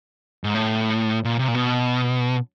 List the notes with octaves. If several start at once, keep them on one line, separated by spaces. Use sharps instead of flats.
G#2
A2
A#2
C3
A#2
B2